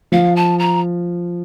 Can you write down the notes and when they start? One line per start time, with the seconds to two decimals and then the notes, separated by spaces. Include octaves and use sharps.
0.12 F3 F5
0.36 A5
0.59 A#5